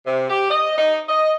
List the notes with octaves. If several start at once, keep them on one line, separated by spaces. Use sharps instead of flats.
C3
G4
D#5
D#4
D#5